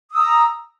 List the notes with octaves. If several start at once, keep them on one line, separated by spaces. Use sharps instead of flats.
A#5 D#6 E6